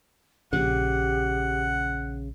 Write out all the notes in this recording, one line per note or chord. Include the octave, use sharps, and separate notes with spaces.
A#1 C#3 G4 F#5